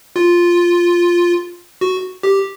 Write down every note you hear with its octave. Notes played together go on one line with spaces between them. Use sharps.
F4
F#4
G4